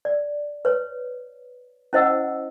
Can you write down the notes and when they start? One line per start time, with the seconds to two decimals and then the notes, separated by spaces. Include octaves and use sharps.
0.05 D5
0.65 B4 C#5
1.93 C#4 E4 C5 D#5 F#5 E6